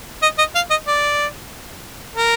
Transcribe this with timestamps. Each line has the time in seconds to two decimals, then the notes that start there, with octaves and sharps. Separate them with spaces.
0.22 D#5
0.38 D#5
0.55 F5
0.70 D#5
0.87 D5
2.16 A#4